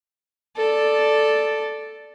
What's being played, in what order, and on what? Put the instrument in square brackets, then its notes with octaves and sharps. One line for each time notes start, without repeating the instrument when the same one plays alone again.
[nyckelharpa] A4 D5